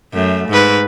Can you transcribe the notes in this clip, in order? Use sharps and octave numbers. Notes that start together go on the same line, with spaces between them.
F#2 A3
G#2 B4